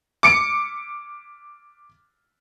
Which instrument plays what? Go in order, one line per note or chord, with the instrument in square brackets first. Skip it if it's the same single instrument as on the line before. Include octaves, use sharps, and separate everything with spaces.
[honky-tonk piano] D6 C#7 D7